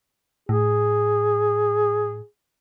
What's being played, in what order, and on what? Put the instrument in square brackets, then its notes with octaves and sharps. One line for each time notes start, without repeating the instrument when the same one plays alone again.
[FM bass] A2 [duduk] G#4